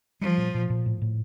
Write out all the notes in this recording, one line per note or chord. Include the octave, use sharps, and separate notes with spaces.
F3 G3
A#2
A#2
A#2
A2
A2